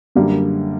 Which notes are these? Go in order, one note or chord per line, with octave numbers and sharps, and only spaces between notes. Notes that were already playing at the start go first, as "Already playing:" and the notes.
F#2 D3 G3 A#3